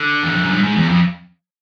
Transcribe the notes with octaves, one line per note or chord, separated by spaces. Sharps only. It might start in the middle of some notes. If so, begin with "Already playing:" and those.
Already playing: D3
E2
F2
F#2
G2
G#2
E2
F2